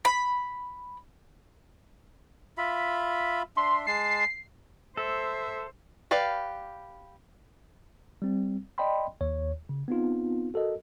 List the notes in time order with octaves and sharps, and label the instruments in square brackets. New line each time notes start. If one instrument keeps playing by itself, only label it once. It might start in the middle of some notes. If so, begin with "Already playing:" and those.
[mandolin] B5
[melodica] F4 E5 B5
[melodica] D4 E5 [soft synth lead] C6
[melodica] G#3 A5 [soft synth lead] C7
[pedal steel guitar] A4 [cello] C5 [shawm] E5
[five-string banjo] G4 B4 D5 F5
[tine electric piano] G3 C4
D5 D#5 G5 A5 B5 C6
D#2 C#5
C#3
B3 C4 D#4 F4
F#4 A4 A#4 D#5